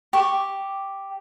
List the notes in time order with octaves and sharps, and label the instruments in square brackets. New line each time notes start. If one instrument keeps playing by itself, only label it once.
[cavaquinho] G4 C#6